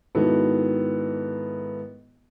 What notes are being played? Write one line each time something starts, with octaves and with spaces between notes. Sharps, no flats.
G#2 D#3 B3 E4 F#4 A4